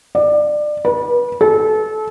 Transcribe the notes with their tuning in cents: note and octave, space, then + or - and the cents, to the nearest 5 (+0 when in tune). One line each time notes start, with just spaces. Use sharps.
D5 +25
B4 -25
A4 -30